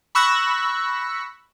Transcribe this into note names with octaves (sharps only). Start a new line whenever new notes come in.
B5 C#6 E6 F#6 A#6